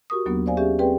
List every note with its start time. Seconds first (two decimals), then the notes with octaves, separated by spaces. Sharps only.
0.10 F#4 G4 A#4 C#6 D#6
0.26 D#2 F#3 A#3 B3 D4
0.46 C5 D5 F5 G#5
0.57 C#4 G4 G#4 E5
0.79 C4 G4 G#4 B4 D5 G5